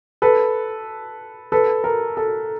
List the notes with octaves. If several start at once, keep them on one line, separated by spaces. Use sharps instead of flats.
A4 B4
A4 B4
A#4
A4